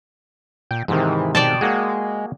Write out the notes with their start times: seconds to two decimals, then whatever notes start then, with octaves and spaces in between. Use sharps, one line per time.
0.71 A#2 G5
0.88 G#2 C3 D#3 E3
1.35 B2 D5 G5 A5
1.61 G#3 A#3 F#4 G#4